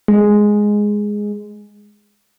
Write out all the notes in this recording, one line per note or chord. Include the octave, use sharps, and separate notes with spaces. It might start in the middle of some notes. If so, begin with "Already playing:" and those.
G#3